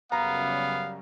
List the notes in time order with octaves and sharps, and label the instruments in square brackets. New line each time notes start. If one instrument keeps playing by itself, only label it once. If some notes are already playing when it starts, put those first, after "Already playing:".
[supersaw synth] F#2 C#3 G3 [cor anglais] B3 [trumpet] F5 [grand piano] A#5